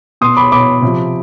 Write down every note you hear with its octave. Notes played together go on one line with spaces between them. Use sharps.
B2 C6 D#6
B5 D6
B2 B5 D6
C3 F3